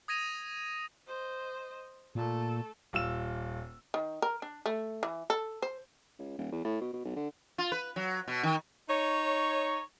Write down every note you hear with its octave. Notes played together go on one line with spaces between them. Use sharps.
D#6 G#6 A#6 D#7 F7
C5 D#5
A#2 A3 A4
D#1 F4 E6 E7
D#3
A#4
D4
A3
E3
A4
C5
C#2
D#1
E2
A2
B2
B2
B1
D3
F4
B4
F#3
B2
D#3
D#4 C#5